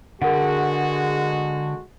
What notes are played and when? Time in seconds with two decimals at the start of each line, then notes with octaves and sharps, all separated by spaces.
0.22 D3 G#3 F#4 G#4 A#4 F#5